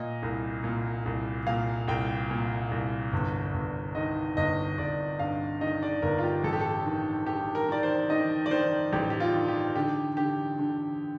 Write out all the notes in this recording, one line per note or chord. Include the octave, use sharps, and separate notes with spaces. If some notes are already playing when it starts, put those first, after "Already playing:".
Already playing: A#2 D#5
C2
A#2
C2
A#2 F5
C2 G5
A#2
C2
G1
G1
D#3 D#5
G1 D#5
G1 D5
G2 F5
D#3 D#5
D5
G1 A#4
F4
G4
A1 A4
G4
A4
D#3
D#3 G4
A#4
D#3 D5
C5
D#3 D#5
D5
D#3 C5
A1 G4
G4
F4
D#3
G4
D3 G4
D3 G4
D3